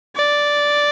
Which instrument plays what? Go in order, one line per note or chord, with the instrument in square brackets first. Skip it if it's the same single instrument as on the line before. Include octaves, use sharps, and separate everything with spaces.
[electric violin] D5